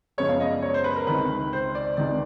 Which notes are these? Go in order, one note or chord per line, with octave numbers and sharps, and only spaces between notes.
F#2 C#3 F3 G#3 B3 C#5
F5
D#5
D5
C#5
C5
B4
A#4
C#2 C3 D#3 B4
C5
D5
C#2 C3 D#3 D5